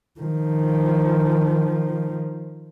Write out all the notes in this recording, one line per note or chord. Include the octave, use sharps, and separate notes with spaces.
D#3 F3